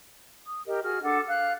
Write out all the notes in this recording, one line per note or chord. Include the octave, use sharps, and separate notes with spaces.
D#6
G4 A#4 D#5
F#4 G#4 F6
D4 A4 F#5 D6
F5 F#6